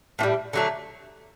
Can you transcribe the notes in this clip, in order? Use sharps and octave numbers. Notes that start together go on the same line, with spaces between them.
A2 E3 G3
D3 F#3 A3